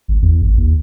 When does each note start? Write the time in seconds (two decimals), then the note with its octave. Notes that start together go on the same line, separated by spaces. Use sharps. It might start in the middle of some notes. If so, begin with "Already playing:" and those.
0.08 G#1
0.22 E2
0.42 G#1
0.58 D#2